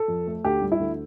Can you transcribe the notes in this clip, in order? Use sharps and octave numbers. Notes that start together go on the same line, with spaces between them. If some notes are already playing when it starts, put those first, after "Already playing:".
Already playing: A4
F2
A3
D2 G4
G3
E4
D2